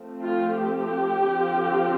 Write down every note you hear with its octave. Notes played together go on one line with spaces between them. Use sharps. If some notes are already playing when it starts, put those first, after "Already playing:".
Already playing: F3 A3 C4
F4
G4
D3 F3 C4